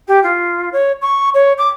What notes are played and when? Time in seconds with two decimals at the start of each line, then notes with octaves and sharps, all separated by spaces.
0.08 G4
0.23 F4
0.72 C#5
1.01 C#6
1.34 C#5
1.58 D6